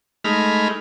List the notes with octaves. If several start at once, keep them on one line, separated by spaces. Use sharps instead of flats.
G#3 A3 D#4 B5 F6